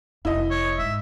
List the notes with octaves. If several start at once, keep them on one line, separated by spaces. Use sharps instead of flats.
F1 E4 D#5
C#5
G#2 E5